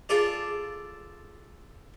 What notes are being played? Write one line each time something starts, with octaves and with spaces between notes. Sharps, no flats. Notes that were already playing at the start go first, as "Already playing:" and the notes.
F4 G#4 A4 D5